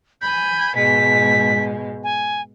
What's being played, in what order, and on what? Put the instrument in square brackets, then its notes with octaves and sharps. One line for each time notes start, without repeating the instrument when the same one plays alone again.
[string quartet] G#5 B5 [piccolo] G6
[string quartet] G#2 B2 G#3 [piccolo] B6
[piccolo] G#5